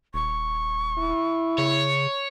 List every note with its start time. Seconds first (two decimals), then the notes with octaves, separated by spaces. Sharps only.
0.14 D#1 C#6
0.98 E4
1.58 C#3 C#5